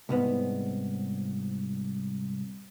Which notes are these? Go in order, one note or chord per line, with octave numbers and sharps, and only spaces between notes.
C2 G#2 B3